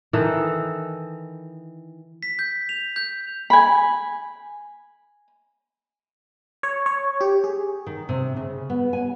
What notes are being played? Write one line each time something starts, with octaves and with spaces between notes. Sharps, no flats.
D#3 E3 A4 D#5
B6
G6
F7
G6
G#5 B5
C#5
C#5
G4
G#4
D#3
C3
C#3
B3
G#5